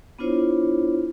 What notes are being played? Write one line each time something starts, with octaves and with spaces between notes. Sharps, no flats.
B3 D4 E4 F4 C5 C#5